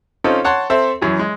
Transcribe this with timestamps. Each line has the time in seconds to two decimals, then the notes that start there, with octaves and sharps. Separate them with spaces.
0.24 C4 C#4 D#4 F4 A4
0.45 C#5 F#5 A5 C6
0.70 C4 A4 C5 E5
1.01 F#2 E3 F#3
1.19 G#3